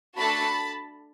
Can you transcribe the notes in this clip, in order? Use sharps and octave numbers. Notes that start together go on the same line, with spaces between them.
A3 D4 F#4 A4 A5 B5